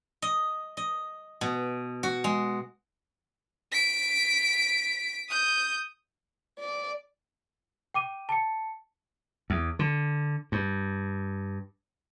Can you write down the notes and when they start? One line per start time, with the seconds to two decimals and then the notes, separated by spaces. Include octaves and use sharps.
0.22 D#5
0.77 D#5
1.41 B2
2.03 F#4
2.24 G#3
3.72 B6 D7
5.29 D#6 G6
6.59 D5
7.94 G5 D6 D#7
8.29 A5 C#7
9.50 E2
9.79 D3
10.52 G2